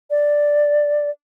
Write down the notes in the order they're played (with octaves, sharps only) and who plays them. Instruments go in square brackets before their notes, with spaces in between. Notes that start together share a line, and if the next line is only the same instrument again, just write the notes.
[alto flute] D5